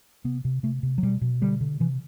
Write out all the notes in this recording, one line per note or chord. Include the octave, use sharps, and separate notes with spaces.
C3 B3
C3
C3 A3
C3
F#3
B2 G3
B2
D3 G3
D3
C3 E3